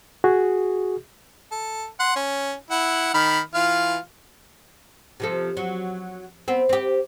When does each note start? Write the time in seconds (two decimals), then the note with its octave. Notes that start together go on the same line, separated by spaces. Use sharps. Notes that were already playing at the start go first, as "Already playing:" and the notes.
0.24 F#4 G#4
1.51 A4
2.00 F#5 C6
2.16 C#4
2.71 E4 F#5
3.14 D#3 B5 F6
3.54 E3 F4 F6
5.20 C3 F3 A4
5.57 F#3
6.48 B3 C4
6.69 C4 G4